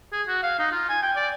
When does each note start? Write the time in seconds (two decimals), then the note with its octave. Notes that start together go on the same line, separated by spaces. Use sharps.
0.12 G#4
0.28 F#4
0.43 F5
0.59 D#4
0.72 F4
0.89 G#5
1.02 G5
1.16 D5